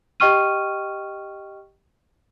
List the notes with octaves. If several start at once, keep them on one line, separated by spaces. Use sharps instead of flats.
G4 D#5 G5 C#6 F6 D#7